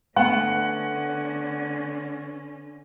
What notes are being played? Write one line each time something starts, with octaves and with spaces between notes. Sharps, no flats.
D3 A3 B3 C#4 F#5